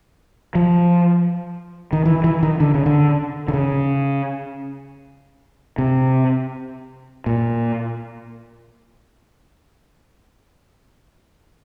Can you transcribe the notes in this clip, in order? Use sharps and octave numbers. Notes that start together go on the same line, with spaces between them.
F3
D#3
E3
E3
D#3
D3
C#3
D3
D3
C#3
C3
A#2